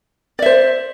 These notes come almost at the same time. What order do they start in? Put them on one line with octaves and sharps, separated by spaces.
D5 E5 C5